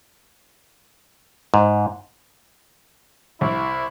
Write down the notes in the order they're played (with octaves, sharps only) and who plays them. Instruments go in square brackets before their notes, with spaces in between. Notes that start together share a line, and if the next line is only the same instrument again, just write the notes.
[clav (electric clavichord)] G#2
[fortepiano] C2 [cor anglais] E4